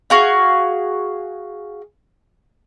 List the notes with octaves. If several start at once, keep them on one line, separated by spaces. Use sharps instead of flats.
F#4 G#4 F5